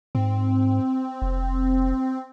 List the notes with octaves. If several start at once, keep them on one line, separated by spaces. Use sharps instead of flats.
G#2 C4
F1